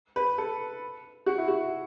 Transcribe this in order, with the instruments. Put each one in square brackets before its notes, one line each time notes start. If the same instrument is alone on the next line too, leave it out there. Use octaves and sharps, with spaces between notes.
[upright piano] B4
A4
F#4
E4
F#4